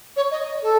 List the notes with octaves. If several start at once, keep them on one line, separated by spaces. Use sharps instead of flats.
C#5
D#5
A4